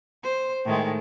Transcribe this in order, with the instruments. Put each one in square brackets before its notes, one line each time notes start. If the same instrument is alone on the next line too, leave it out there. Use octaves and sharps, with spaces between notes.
[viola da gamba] C5
A2 D#3 G#3